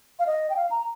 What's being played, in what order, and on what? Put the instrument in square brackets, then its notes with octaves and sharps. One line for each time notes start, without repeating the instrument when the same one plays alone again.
[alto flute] F5
D#5
G5
F5
A#5